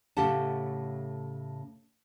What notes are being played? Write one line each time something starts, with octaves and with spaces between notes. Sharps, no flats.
A2 C#3 A3 G4 F#5 A5